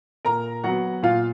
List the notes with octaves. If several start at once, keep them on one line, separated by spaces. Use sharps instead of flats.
A#2 A#4 A#5
F#3 B3 F#4 F#5
A#2 F4 F5